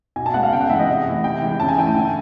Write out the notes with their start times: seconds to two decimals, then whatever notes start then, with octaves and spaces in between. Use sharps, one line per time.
0.16 B2 G#5
0.26 A5
0.34 G#3 B3 F#5
0.43 F5
0.52 C#3 G5
0.61 F#5
0.70 E3 G#3 E5
0.79 D#5
0.89 C3
1.06 E3 A3
1.24 C3 G5
1.41 E3 G#3
1.60 C#3 A5
1.68 G#5
1.77 E3 A3 G5
1.87 G#5
1.95 D3